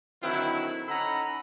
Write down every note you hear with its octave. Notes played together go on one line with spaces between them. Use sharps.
D3 D#3 F#3 C4 E4
C#4 D#4 A4 F#5 A#5 B5